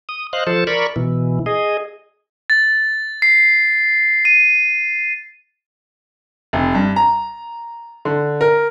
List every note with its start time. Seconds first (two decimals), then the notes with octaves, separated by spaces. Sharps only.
0.09 D#6
0.33 C5 D#5 F5 F#6
0.47 F3 A4 C5 A5
0.67 A#4 D5 B5 C#6
0.96 B2 E3
1.46 G#4 D#5
2.50 A6
3.22 C7
4.25 D#7
6.53 F1
6.75 G2
6.96 A#5
8.05 D3
8.41 A#4